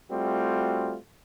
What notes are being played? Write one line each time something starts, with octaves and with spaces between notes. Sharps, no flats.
G3 A3 C4 F4 F#4